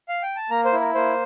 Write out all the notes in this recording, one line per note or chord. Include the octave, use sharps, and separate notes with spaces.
F5
G5
A5
A#3 A#5
C5
E4
A#4
A#3 C5